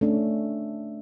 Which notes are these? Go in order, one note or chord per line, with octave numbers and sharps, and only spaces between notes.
A3 C#4 D4